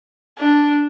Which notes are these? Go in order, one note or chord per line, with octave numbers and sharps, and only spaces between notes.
D4